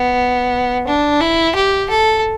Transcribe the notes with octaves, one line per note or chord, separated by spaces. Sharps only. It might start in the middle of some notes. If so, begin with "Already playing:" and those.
Already playing: B3
D4
E4
G4
A4